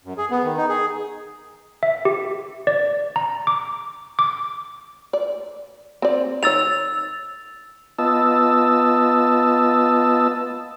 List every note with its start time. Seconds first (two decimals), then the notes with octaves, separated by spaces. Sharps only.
0.04 F#2
0.17 G#4
0.30 B3
0.43 D#3
0.57 D#4
0.69 G#4
1.83 E5
2.05 G4
2.67 D5
3.16 A#5
3.47 D6
4.19 D6
5.13 D5
6.02 C4 D5
6.43 D#3 C#5 E6 A6 F7
7.99 B3 F4 D#5 A5 E6